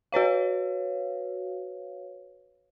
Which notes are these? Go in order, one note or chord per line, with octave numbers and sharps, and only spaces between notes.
F#4 B4 C#5 F5